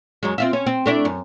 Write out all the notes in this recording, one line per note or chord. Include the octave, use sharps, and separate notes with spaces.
F#2 F#3 G#3
C4 F4 E5
C#4
C4
A3 D4 E4
F#2